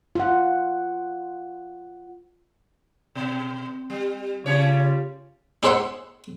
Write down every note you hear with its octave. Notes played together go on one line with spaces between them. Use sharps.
F4 F#5
B2
G3
C#3 G3 C#4 F4 C#5
D#4 G#4 C5 E5 F#5 C6